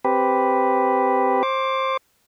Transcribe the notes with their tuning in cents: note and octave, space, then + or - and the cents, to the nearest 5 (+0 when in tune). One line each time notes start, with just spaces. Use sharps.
C4 +0 G4 +0 B4 +0
C5 +20 D6 -5